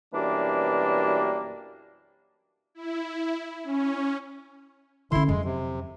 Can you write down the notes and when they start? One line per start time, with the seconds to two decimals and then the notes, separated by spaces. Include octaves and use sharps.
0.14 F#2 B2 E3 G3 A#3 D4
2.75 E4
3.64 C#4
5.12 D3 C#4 E4 C6
5.28 F2 F#3 G#3
5.45 C3